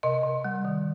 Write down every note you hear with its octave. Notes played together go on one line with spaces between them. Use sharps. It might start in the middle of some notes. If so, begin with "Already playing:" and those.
C3 D#5
C3
G3
D#3